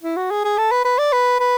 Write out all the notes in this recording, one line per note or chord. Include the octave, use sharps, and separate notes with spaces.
E4
F#4
G#4
G#4
A4
B4
B4
D5
B4
B4